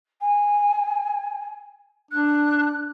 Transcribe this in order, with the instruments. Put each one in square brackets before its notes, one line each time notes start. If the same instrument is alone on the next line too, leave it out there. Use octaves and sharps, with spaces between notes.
[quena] G#5
[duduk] D4 [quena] F#6